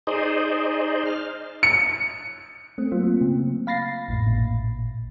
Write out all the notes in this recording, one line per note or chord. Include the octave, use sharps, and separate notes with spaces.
D#4 G#4 C5 D5 D#5
F6
C#7
A3 C4
F#3 A#3 C4 F4
C#3
F5 B5 A6 A#6 C7
A1 F2 A2
G#1 A#2